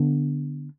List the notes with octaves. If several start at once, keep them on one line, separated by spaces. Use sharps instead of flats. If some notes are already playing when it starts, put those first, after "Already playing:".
Already playing: D3 B3 D4